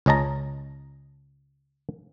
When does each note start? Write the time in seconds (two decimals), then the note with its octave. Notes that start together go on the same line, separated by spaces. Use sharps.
0.06 C#2 C#4 D#5 A5 A#5